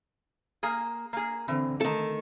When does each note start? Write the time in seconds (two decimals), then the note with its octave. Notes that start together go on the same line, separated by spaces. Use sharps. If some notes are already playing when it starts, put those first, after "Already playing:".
0.63 A#3 G#4
1.13 A#3 G#4
1.48 D3 E3 C4
1.81 D#3 A3 A4